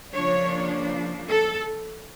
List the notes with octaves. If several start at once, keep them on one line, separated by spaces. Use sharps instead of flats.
C#3 F3 A#3 D4 C#5
A4